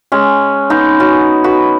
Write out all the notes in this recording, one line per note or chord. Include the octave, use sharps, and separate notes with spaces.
G#3 C#4
B3 D#4
C#4 F#4
F#4 B4